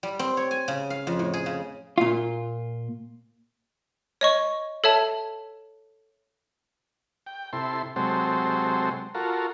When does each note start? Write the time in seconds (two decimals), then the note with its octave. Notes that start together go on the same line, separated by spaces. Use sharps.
0.03 G3
0.19 C4
0.37 C#5
0.51 G#5
0.68 C#3
0.90 F5
1.07 F2
1.19 A2
1.34 G#4
1.46 C#3
1.98 A#2 F4
4.21 C#5 D#5 C#6
4.84 A4 C#5 E5 A5
7.26 G5
7.53 C3 E4 A4 C6
7.96 C3 F#3 G#3 C4 A4 C5
9.15 F4 F#4 A4 A#4